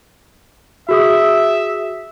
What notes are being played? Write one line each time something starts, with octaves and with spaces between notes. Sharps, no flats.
F#4 G#4 E5 D#6